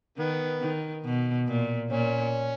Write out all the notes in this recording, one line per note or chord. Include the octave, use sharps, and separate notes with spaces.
D#3 B3
D#3
B2
A#2
A#2 C#4